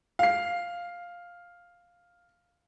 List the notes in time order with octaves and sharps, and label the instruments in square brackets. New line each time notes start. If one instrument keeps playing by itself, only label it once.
[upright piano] F5 C7